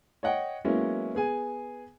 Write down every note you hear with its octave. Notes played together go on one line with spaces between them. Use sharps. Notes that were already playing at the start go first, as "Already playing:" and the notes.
C#5 D#5 F#5 G5
F#3 G#3 A#3 B3 C#4 E4
B3 G#4 G#5